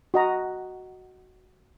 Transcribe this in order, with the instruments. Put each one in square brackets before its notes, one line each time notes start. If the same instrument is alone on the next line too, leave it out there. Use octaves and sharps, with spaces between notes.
[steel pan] F#4 D#5 A#5